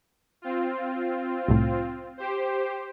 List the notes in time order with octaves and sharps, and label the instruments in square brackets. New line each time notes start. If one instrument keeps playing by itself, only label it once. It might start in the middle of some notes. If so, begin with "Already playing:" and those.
[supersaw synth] C4 F4
[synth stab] C2 A2
[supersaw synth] G4 C5